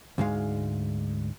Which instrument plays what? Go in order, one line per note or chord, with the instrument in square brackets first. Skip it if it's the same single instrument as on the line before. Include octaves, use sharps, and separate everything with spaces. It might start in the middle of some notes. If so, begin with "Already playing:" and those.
[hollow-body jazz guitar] D2 G#2 G#3 F5